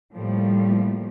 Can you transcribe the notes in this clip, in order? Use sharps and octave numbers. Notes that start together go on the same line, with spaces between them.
A2 F3 G3 A3 A#3